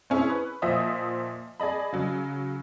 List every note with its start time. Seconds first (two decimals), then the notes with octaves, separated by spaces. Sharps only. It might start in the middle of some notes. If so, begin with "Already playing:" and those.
0.10 C4 C#4 E4 G#4
0.29 B4
0.62 A#2 F3 C5 D#5 E5 D#6
1.60 G#4 D5 D#5 B5
1.92 C#3 F#3